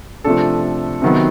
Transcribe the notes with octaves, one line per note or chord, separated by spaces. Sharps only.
C3 F3 A3 D4 A4
C3 D#3 F#3 B3